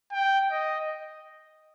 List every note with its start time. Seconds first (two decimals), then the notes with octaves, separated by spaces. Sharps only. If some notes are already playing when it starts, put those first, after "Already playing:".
0.12 G5
0.51 D#5